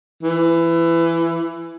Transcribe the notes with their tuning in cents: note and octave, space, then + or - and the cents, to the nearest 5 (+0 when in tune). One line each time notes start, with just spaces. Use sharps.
E3 +20